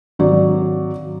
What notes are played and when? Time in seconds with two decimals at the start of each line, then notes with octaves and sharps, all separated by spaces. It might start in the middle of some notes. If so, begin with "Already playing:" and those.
0.19 G#1 F#3 D5